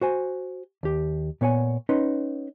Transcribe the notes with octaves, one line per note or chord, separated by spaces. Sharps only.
F#4 C5 G#5
D#2 G4
A#2 B3 C#5 F#5 G#5
C#4 D#4 B4 F#5 C6